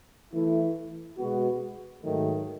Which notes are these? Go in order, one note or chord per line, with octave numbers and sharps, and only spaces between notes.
E3 A3 E4
B2 G#3 B3 F#4
G#2 D#3 F#3 A3